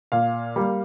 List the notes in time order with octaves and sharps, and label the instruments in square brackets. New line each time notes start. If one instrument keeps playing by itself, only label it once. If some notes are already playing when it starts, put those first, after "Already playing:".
[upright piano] A#2 F5
G3 A#3